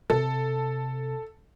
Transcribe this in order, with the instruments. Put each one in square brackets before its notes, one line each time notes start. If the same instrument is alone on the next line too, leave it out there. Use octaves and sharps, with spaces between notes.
[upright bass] C3 [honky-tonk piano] A4